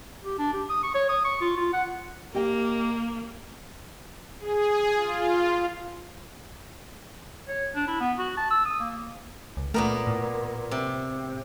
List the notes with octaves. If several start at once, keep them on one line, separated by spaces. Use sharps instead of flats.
G4
D4
G4
D#6
C#6
C#5
D#6
C#6
F4
F4
F#5
A#3 G4 D#5 G5
G#4
F4
C#5
D4
E4
B3
F#4
A5
E6
D#6
A#3
C#2
A#2 A3 B3 A#4
A2
C3